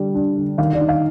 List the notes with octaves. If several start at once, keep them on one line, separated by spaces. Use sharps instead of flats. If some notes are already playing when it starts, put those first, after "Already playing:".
Already playing: D3 G3
D4
D3
D#3 F5
D5
D#4
F5